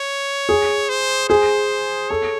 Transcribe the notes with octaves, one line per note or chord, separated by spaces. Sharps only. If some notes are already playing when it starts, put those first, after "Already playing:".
Already playing: C#5
G#4
C5
G#4 C5
A4 C#5